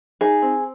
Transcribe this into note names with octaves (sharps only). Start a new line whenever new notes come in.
D#4 G#4
C4